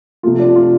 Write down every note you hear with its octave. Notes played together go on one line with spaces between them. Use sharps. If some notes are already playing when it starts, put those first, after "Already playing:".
C3 F3 A3 F4
D4
F4